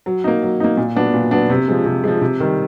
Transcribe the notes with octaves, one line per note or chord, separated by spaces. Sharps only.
F#3
A#3 D#4
F#3
A#3 D#4
A#2
F#3 B3 D4
A#2
F#3 B3 D4
C3
F3 G#3
C3
F3 G#3
C3
D#3 G3